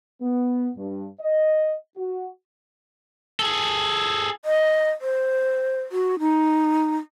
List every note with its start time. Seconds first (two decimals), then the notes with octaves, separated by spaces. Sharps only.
0.21 B3
0.77 G2
1.20 D#5
1.97 F#4
3.39 G#4 A4
4.45 D#5
5.01 C5
5.92 F#4
6.19 D#4